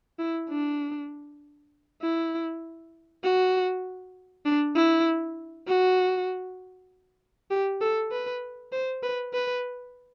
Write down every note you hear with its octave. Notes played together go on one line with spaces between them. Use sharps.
E4
D4
E4
F#4
D4
E4
F#4
G4
A4
B4
C5
B4
B4